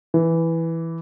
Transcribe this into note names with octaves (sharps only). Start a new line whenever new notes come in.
E3